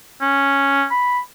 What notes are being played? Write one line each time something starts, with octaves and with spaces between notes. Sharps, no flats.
C#4
B5